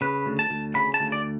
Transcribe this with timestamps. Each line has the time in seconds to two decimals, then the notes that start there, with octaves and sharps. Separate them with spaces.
0.01 C#3 B4
0.26 D2
0.39 A5
0.50 D2
0.75 C#3 B5
0.94 A5
1.00 D2
1.12 D5